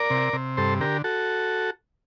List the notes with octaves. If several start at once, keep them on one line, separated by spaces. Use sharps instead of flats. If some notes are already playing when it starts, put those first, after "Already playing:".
Already playing: A#4 D5
C3
C3
G2 A4 C5
D3 G4 A#4
F#4 A4